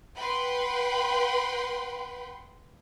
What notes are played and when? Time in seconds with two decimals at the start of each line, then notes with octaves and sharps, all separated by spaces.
0.18 B4 F#5 G5 B5 C6